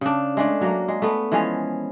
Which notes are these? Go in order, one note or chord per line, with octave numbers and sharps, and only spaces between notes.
C#3 D4
G#3 A3 D4
F#3 A#3
G#3
A3 B3
E3 F3 G#3 C#4